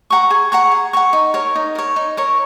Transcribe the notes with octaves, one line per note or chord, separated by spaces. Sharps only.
F#5 A#5 C#6
G#4
F#5 A#5 C#6
G#4
F#5 A#5 C#6
D#4
A#4 C#5
D#4
A#4 C#5
D#4
A#4 C#5